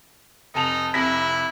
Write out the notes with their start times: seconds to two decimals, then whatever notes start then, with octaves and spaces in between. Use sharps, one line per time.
0.55 F1 D#4 A5 F7
0.94 F1 C3 E4 A#6